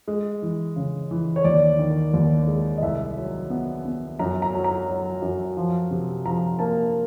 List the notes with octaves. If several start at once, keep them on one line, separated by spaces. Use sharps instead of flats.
G#3
E3
C#3
E3
C#5
D#2 D5
D#3
D#2
G#3
D#5
C2 E5
F#3
B3
B3
F#2 A#5
A#5
F#3
A#5
F#3
F#2
F3
C3
F3 A#5
A#3 A5